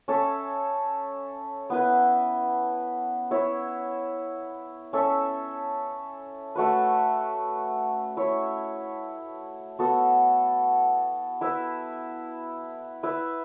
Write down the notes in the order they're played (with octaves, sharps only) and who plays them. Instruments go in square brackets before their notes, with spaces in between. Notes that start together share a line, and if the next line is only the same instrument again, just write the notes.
[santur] C#4 A4 E5
B3 E4 B4
E4 C#5 E5
C#4 A4 E5
A3 F#4 B4
E4 C#5 E5
B3 F#4 A4
E4 B4 E5
E4 B4 E5